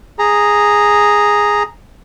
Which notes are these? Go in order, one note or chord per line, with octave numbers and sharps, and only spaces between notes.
G#4 A#5